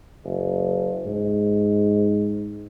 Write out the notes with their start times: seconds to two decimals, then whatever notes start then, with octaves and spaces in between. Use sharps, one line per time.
0.24 F#1
1.05 G#2